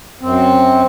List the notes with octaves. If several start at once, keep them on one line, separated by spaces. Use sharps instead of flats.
F#2 C4